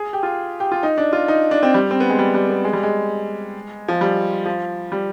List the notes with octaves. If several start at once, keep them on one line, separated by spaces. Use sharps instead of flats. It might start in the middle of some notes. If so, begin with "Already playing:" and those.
Already playing: G#4
G4
F4
G4
F4
D#4
D4
F4
D#4
D4
C4
G3
C4
B3
G#3
G3
G3
B3
G#3
G3
G#3
F3
G3
F3
G3